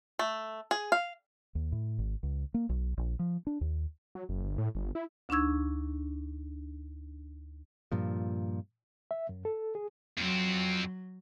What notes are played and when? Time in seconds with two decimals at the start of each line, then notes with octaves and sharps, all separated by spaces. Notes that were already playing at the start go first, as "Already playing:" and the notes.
0.19 A3
0.71 G#4
0.92 F5
1.55 D#2
1.72 A2
1.98 G#1
2.23 C#2
2.54 A#3
2.69 B1
2.97 A#1
3.19 F3
3.47 D4
3.61 D#2
4.15 F#3
4.29 F#1
4.43 G1
4.58 A2
4.75 G1
4.95 E4
5.29 D2 D4 D#4 C#6 E6 G#6
7.92 G2 A#2 F3
9.11 E5
9.29 F#2
9.45 A4
9.75 G#4
10.17 F2 F#3 C4